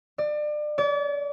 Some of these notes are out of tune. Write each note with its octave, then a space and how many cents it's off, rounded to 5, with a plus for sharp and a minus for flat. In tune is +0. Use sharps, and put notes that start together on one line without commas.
D5 +30
D5 -40